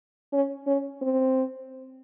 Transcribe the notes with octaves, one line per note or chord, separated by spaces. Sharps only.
C#4
C#4
C4